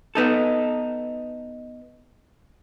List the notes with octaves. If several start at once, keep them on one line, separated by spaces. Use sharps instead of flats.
B3 D#4 A4